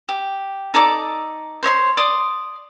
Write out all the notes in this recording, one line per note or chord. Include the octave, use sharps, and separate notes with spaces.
G4
D#4 A4 D5 D6
C5 C#5 D#5 C6
D5 C6 D6 D#6